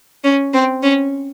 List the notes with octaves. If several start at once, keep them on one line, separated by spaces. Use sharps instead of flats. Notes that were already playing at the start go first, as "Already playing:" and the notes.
C#4
C4
C#4